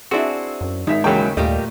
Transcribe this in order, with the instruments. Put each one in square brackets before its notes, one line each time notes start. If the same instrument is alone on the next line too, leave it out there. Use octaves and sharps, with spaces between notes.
[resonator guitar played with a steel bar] C4 E4 [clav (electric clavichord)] D4 F#4 [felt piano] G#4
[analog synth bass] F#2
[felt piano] G#1 E5 B6 [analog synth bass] G#3 [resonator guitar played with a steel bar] D#4
[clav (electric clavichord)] D#2 C#3 [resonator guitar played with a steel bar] A2 E3 F#3 [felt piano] G#4 A#4 G5
[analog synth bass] D#2 [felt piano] A#2 A3 [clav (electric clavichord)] G3 [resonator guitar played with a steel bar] G4 A#4 D#5